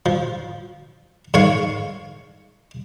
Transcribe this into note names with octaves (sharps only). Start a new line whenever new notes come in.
F3
G#2 C#5 F5